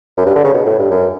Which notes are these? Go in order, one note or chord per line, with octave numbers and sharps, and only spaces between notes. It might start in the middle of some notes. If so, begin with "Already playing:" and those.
F#2
G2
D3
C#3
B2
A2
G2
F#2